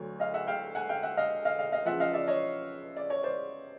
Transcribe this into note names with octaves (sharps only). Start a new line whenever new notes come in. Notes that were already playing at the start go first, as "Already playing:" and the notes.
Already playing: D2 D3 F#3 C#5
D#5 F5
E5 F#5
F5 G5
F#5 G#5
F5 G5
E5 F#5
D#5 F5
D#5 F5
D#5 F5
D#5 F5
E2 C#3 F3 E5 F#5
D#5 F5
D5 E5
C#5 D#5
D5
C#5
C5 D5